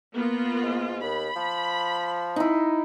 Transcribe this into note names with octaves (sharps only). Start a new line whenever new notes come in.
A#3 B3 F4
G#2
D#2 B5
F3
D#4 E4